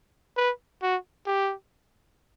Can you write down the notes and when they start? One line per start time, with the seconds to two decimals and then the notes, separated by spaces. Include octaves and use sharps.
0.37 B4
0.82 F#4
1.27 G4